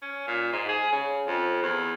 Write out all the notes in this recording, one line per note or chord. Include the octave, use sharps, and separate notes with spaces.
C#4
A#2
G#2
G#4
C#3
F2
E2